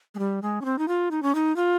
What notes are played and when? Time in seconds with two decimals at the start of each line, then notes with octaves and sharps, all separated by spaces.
0.15 G#3
0.19 G3
0.42 G#3
0.61 C#4
0.65 C4
0.79 D#4
0.88 F4
1.11 D#4
1.23 C#4
1.35 D#4
1.56 F4